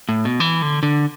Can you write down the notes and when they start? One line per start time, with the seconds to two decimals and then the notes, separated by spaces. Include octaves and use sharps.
0.09 A2
0.25 B2
0.40 E3
0.62 D3
0.83 D3